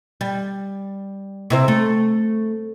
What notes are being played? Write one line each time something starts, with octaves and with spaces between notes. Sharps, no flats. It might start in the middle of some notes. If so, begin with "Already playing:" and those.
G3
C3 E4 C5
A3